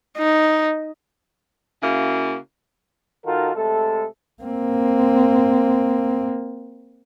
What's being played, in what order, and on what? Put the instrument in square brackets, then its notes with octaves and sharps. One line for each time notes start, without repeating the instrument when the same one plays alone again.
[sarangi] D#4
[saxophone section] C#3 A#3 E4 F#4
[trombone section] D#3 D#4 F4 F#4 A4 A#4
C3 G#3 A3 A4
[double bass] A#3 C4